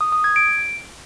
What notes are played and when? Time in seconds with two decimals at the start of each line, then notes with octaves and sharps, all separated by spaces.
0.01 D#6
0.12 D#6
0.24 G#6
0.36 D7